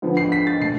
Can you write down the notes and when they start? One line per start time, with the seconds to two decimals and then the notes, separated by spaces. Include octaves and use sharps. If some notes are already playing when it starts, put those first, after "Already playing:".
0.02 D3 F3 B3
0.17 C7
0.32 B6
0.47 A6
0.61 B2 A3 C7